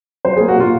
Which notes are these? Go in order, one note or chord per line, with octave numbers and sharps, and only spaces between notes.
F#3 C5
A#3 G#4
F#4
A#2 F4